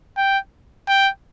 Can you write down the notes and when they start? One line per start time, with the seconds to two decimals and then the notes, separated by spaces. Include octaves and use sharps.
0.17 G5
0.88 G5